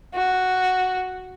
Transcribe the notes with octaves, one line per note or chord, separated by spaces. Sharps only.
F#4